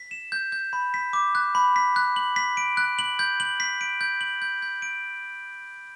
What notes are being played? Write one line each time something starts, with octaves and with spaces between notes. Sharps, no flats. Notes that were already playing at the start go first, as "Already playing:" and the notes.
Already playing: B6
E7
G6
G6
B5
B6
D6
F#6
B5
B6
F#6
F#7
B6
D7
F#6
F#7
G6
F#7
B6
D7
G6
F#7
G6
G6
D7